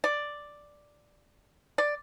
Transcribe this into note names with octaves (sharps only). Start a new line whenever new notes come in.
D5
D5